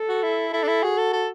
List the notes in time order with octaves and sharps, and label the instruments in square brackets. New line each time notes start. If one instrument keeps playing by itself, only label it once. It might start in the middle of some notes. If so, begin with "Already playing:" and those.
Already playing: [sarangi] A4
[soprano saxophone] F#4
E4
[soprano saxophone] E4 [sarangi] A4
[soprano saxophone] D4
E4
[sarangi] F#4 [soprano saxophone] G#4
[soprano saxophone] A4
A4